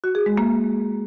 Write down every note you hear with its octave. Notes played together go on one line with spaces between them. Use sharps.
F#4
G#4
G#3
A#3